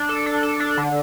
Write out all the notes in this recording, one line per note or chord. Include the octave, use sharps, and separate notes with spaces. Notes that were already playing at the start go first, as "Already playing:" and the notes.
Already playing: D4
A4
D4
A4
D4
D3